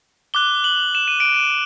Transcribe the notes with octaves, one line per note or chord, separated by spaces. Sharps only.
D6 F#6 G7
F#7
E7
D#7
D7
D#7